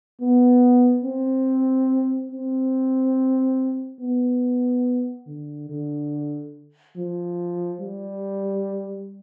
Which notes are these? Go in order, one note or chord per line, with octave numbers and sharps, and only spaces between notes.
B3
C4
C4
B3
D3
D3
F3
G3